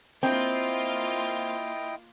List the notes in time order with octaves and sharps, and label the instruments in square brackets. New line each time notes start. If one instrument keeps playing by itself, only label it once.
[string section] A#3 F4 [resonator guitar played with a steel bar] C4 [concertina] E4 D#5 G5